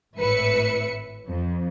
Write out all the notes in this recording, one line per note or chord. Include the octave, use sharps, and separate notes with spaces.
G#1 A2 B4 E5 C#7
F2